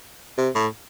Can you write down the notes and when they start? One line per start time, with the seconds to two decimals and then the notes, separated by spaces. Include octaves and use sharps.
0.37 C3
0.55 A2